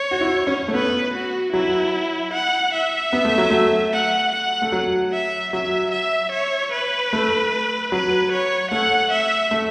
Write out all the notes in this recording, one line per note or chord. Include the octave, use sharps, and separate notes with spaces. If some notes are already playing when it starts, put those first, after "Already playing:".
Already playing: C#5
F#4
E4
C#4
A3
B3 B4
F#4
F#3 E4
F#5
E5
B3
A3
F#3
A3
F#5
F#5
A3
F#3
E5
F#3 E5
E5
C#5
B4
A3
F#3 B4
C#5
A3 F#5
E5
A3